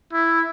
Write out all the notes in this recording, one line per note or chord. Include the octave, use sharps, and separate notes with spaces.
E4